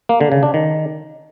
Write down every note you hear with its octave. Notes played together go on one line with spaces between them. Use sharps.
A#3
D3
C#3
D4
D#3